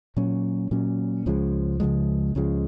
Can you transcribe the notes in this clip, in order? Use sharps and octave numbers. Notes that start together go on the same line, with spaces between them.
A#2 F#3 C#4
A#2 F#3 C#4
C#2 C#3 F3 G#3
C#2 C#3 F3 G#3
C#2 C#3 F3 G#3